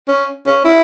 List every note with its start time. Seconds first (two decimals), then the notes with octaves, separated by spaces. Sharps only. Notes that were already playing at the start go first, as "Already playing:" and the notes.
0.08 C#4
0.47 C#4
0.65 E4